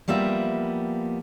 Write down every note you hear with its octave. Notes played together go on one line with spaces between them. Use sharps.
F3 G3 A#3 B3 E5